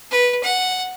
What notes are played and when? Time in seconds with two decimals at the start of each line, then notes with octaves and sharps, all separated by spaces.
0.11 B4
0.44 F#5